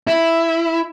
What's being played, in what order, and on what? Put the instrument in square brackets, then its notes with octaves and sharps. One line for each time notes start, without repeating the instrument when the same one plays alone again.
[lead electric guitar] E4